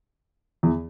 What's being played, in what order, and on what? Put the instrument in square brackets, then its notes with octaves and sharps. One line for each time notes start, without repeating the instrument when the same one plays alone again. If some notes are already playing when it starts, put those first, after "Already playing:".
[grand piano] E2